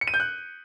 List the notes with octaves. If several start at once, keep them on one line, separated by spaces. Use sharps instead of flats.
C#7
D#7
G6
F#6